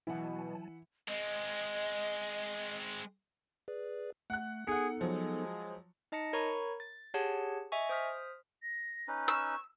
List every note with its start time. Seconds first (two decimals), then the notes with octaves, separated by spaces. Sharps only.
0.07 B2 E3 F#3 E4 F#5 G#5 A5
1.08 G#3 C4 D#5
3.68 G#4 B4 D5
4.30 A3 F#5 F#6
4.67 B3 D#4 G#4 A4 F#5 C#7
5.01 F3 F#3 G#3
6.12 D#4 D#5 A5 A#6 C#7
6.33 A#4 C#5 A#5 B5 C#6
6.80 A6
7.14 G4 G#4 C#5 F#5 A5
7.72 D#5 E5 G#5 C#6
7.89 C5 D#6 F6 B6
8.62 A#6
9.08 C#4 D#4 B4
9.28 C#6 E6